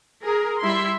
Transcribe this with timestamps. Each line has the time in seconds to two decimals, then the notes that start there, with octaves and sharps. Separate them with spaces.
0.23 G#4 A#4
0.60 G3 E4 E5 C6